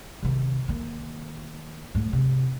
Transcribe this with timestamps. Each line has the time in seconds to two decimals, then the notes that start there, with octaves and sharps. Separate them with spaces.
0.23 C3 D#3
0.68 D#3 A#3
1.95 G#2 A3
2.13 C3